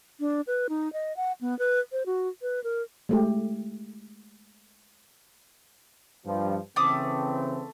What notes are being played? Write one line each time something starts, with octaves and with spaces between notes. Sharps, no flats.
D4
B4
D#4
D#5
F#5
B3
B4
C5
F#4
B4
A#4
G#3 A3 G4
G2 F3
C#3 E3 A3 C4 D6 D#6